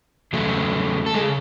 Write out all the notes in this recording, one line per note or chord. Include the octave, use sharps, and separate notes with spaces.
E2 C#3 F#3 A3
A4
C#3 G#3 G#4